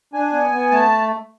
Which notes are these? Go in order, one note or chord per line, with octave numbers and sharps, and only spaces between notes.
D4 G#5
B3
B3
A3 A5